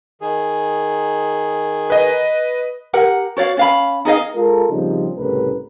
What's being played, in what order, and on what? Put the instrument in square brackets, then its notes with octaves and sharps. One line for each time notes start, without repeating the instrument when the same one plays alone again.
[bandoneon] D#3 G#4
[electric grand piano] B4 D#5
[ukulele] G4 A#4 F#5
F#4 C#5 D5 F5
C#4 F5 B5
D#4 G#4 D#5 F5
[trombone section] G#3 F4 A4 A#4
A#2 C#3 F3 G3 C4 D#4
C2 A2 C#3 A3 A#4 B4